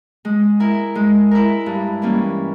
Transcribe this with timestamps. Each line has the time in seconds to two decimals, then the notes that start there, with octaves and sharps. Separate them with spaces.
0.25 G#3
0.60 E4 A#4
0.95 G#3
1.31 E4 A#4
1.66 G2
2.02 E3 G3 A#3 C#4